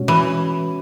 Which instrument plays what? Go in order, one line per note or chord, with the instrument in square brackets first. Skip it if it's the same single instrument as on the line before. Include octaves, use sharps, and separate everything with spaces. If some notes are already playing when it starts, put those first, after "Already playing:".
Already playing: [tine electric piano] B2 G#3 C#4 F#4 C#5
[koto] E3